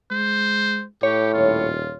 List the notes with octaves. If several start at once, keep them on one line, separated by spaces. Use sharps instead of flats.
G#3 C5
A2 G4 C#5
D#1 F4